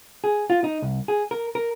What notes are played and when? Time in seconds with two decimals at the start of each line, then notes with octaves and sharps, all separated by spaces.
0.24 G#4
0.50 F4
0.64 D#4
0.82 C2
1.08 G#4
1.31 A#4
1.55 A#4